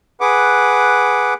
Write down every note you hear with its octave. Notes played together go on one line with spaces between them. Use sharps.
G#4 B4 F#5 D6